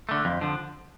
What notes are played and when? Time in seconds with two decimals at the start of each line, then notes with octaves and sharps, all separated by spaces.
0.09 D3 A3
0.25 F2
0.41 D3 F3